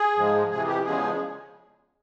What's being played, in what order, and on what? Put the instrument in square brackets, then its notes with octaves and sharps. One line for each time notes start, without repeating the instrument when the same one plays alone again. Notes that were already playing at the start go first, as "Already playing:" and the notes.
Already playing: [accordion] G#4
G#2 F3 G#3
F2 C3 E3 G#4
G4
E2 C#3 F3 G#3 G#4